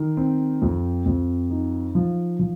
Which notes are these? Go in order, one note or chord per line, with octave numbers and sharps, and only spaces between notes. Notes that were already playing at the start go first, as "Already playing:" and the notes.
Already playing: D#3
C4
F2
F2
D#4
F3
F3